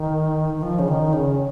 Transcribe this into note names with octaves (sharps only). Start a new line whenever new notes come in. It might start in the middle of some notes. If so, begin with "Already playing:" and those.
Already playing: D#3
D#3
F3
C#3
D#3
C#3